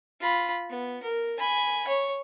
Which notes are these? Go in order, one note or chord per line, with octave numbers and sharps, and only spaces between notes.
F4 B5
B3
A#4
G#5 B5
C#5